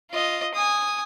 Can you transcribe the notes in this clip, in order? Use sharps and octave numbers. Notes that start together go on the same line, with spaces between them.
F4 D#5
G#5 D#6